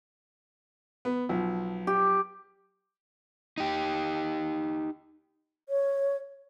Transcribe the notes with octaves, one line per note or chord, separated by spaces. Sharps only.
B3
B1 F3
G4
D#4 G4
C#5